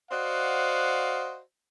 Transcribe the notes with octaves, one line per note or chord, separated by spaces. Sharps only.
F#4 C5 D5 D#5 F5 F#5